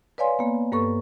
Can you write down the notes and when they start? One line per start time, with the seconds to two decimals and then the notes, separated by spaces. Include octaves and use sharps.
0.18 B4 C#5 D5 F5 G#5 C6
0.39 A#3 B3
0.72 G2 A#3 A4 B4 C#6